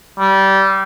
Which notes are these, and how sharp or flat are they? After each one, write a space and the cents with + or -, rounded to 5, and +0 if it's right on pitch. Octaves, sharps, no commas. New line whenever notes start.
G3 -20